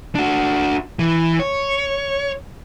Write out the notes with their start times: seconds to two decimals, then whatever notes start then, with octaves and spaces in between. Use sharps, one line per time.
0.15 D4 F#4
0.99 E3
1.39 C#5